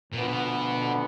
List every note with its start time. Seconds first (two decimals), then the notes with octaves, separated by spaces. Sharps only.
0.13 D2 A#2 D3 F3 B3
0.27 B2